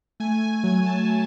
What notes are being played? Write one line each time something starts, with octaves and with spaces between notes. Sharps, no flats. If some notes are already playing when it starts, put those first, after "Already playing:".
A3 G#5
G#5
F#3 G#5
A5
A3